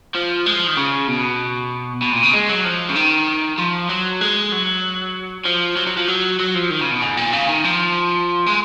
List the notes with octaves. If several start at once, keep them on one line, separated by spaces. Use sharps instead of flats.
F3
G#3
F3
D#3
C#3
B2
B2
A#2
C#3
G#3
F#3
F3
C#3
D#3
F3
F#3
G#3
F#3
F3
F#3
F#3
F3
F#3
F#3
F3
D#3
C#3
B2
G#2
A#2
C#3
D#3
F3
G#3